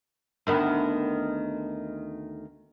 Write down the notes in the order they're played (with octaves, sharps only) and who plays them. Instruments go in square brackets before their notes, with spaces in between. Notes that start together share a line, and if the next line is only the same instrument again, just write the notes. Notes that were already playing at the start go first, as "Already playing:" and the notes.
[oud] D2 D#3 B3